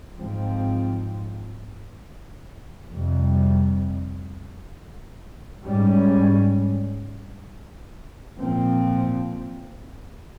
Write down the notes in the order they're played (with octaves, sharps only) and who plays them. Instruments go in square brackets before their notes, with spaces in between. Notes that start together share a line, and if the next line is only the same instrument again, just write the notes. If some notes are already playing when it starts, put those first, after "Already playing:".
[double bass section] G#2 F3 C4
F2 C3 G3
G#2 G3 C#4
A#2 F3 C4